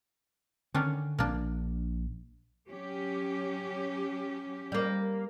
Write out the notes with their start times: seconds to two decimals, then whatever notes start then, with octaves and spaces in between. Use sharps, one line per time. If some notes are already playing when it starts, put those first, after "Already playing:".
0.74 D3 D#3 C#4 D4
1.19 A#1 A#3 D4
2.70 F#3 C#4 G4
4.72 G3 A#3